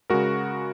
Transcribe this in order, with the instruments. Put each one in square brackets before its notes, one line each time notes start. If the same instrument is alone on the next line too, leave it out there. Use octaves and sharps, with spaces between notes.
[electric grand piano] C#3 G#3 F#4 A#4